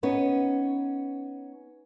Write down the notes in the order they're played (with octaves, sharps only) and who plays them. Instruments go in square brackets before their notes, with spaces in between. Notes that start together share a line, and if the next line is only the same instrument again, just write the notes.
[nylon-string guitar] B3 C#4 D#4